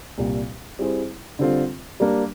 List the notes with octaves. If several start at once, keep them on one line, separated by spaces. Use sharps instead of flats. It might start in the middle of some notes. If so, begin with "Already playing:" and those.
C2 A#2 G3
G3 C4 E4 G#4 C5
D3 G3 C4 F4 A4
G3 A#3 D4